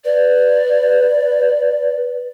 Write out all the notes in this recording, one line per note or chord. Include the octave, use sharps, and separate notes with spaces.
B4 D5